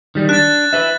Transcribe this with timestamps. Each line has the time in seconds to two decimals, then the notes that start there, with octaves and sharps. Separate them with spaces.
0.15 D#3 G3
0.29 D4 F#6 A6
0.73 B4 E5